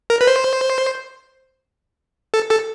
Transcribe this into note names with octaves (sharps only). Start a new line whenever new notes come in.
A#4
B4
C5
A4
A4